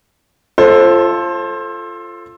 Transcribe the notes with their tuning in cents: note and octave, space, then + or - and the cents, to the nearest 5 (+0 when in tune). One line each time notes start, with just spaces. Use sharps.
F4 -15 A4 +0 C5 +25